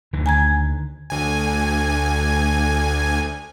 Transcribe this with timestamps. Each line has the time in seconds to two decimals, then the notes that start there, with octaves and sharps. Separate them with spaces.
0.13 D2 D3 D#3
0.26 G#5 A#5 G#6
1.10 D2 G#5